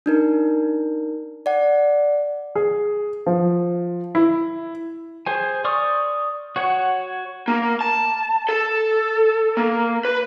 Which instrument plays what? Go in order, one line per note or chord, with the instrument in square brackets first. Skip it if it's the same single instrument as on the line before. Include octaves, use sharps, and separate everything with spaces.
[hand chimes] D4 D#4 A#4
D5 F#5
[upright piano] G#4
F3
E4
[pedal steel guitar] G#4 C5 G#5
D5 C6 C#6 D#6 F6
F#4 C#5 F#5
[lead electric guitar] A#3
A5
A4
A#3
B4